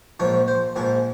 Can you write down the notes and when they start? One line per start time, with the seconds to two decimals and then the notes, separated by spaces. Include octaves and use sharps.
0.20 A#1 G#2 F3 C#5
0.48 C5
0.76 A#1 G#2 F3 G#4